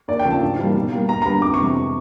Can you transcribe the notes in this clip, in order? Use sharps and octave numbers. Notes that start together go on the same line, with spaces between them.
D#2 D5
G5
C#3 F3 A3
A5
G#2
E3 G3 A#3
B2
G3 A#3
D#2 A#5
A#5
D3 G3 B3 B5
F2 D6
C#6
C3 E3 G#3 B3